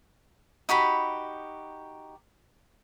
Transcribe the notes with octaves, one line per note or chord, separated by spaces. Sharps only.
D#4 F#4 G4 B5